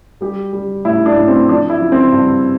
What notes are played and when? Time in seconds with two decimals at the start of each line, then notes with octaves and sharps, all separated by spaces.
0.21 G3 G4
0.53 G3
0.85 A2 E4
1.06 D4
1.16 A2
1.28 C4
1.49 F3 D4
1.70 E4
1.81 F3
1.92 C4
2.12 G2